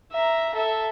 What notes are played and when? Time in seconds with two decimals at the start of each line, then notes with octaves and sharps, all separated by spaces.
0.12 E5 A#5
0.55 A4 E5